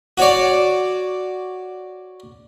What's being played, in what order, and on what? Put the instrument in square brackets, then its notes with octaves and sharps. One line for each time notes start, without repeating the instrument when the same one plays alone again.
[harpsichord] F#4 C#5 D5